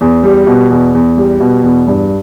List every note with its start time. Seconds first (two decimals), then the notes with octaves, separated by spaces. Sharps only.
0.01 E2
0.23 G3
0.47 B2
0.70 E2
0.94 E2
1.17 G3
1.40 B2
1.63 E2
1.88 G2